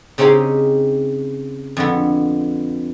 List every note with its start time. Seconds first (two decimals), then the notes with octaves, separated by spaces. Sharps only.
0.18 C#3 C4 C#4 D#4 G4 G#4
1.77 F2 D3 B3